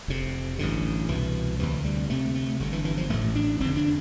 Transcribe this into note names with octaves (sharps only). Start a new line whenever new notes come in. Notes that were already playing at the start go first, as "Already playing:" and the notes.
F1 F2 C3
A1 G2 D3
C2 B2 E3
D2 C3 E3
G3
D2 C3 A3
A3
G1 G2 D3
E3
E3
F3
A1 A2 A3
D4
F1 E2 D3 C4
D4